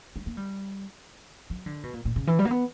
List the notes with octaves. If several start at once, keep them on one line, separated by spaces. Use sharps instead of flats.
G3
A#3
G3
F#3
D3
B2
A#2
A#2
C#3
E3
G3
A#3
B3